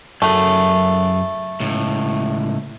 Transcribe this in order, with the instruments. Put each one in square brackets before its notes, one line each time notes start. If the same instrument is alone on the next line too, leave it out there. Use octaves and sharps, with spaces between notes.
[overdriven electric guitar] F#2 G#4 [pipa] A3
[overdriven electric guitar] C#2 A2